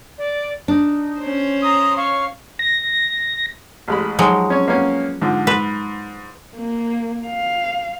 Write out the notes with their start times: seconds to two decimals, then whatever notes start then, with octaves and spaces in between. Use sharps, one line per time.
0.15 D5
0.68 D4 D#4
1.20 C#4 C5
1.62 A#5 C6 D#6
1.96 C#5 F5 C#6
2.59 A#6
3.88 A1 G#3 B5
4.19 F3 F#3 G#3 D#4
4.50 C#4 C#5
4.68 A#3 B3 C#4
5.22 G#2 D3 F3
5.47 G#2 B4
6.57 A#3
7.27 F5